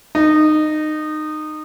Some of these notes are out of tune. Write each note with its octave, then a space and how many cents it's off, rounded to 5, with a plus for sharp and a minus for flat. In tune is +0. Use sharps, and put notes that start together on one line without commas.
D#4 -20